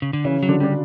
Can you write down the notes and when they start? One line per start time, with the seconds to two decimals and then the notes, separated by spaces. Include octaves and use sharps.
0.02 C#3
0.13 D3
0.24 C#3 E3 C#4
0.43 F#3
0.48 D3 D4
0.60 G3 D4